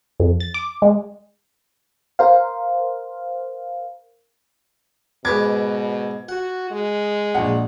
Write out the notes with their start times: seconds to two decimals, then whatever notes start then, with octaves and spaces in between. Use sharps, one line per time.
0.20 F2
0.40 A6
0.54 D6
0.82 G#3
2.19 A#4 C5 F5
5.25 G#2 B2 B4 D6 G#6
6.29 F#4 F#5
6.71 G#3
7.35 A#1 F#5